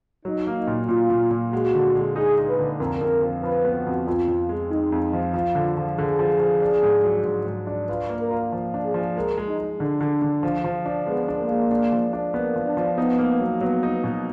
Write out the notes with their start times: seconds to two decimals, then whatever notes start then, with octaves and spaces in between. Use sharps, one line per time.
0.25 F#3 D#4
0.47 A#3
0.57 D#4
0.68 A#2
0.89 A#2 F4
1.10 A#2
1.31 A#2
1.53 G#3 F#4
1.74 D3
1.96 G#3
2.16 D#4 G#4
2.37 D#4
2.48 B4
2.59 D3
2.80 F2 A#4
3.01 F2
3.22 F3
3.44 F3 B4
3.65 B3
3.75 F#4
3.86 F2
4.07 F2 F4
4.28 F2
4.49 G#3
4.71 G#3 D#4
4.92 F2
5.13 F3
5.34 F3 F4
5.55 D3
5.77 F3
5.98 D3 G#4
6.19 F3
6.40 F3
6.62 D4
6.83 G#2
7.03 F#3
7.25 G#2
7.47 G#2
7.67 D4
7.89 F4 B4
8.09 A#3
8.21 A#4
8.31 F4
8.52 F3
8.74 D4
8.84 G#4
8.94 F3
9.16 G#3 A#4
9.38 G#3
9.48 D#4
9.59 G#3
9.79 D3 D4
10.01 D3
10.22 D3
10.43 F3
10.64 F3
10.86 D4
11.07 G#3 B3
11.28 D4
11.39 A#3
11.49 G#3
11.71 D4
11.92 F3
12.13 D4
12.34 A#3 B3
12.56 F3
12.66 D4
12.77 F3
12.98 B3 D#4
13.19 A#3
13.41 F#3
13.61 F#3 B3
13.83 D#4
14.04 B2